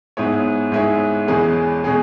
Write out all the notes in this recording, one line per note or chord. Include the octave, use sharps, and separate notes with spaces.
G#2 G#3 B3 E4 C#5
G#2 G#3 B3 E4 C#5
E2 B2 G#3 C#4 G#4
B2 G#3 C#4 G#4